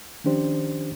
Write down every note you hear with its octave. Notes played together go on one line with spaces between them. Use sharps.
D#3 F3 C#4 D4 G4 C5